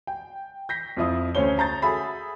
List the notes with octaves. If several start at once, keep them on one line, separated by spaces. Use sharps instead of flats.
G5
G6 A#6 B6
F2 F3 E4 D#6
D2 A3 C#4 C5 C#5 G7
A5 A#5 G6 A6
F#4 G#4 A4 E5 B5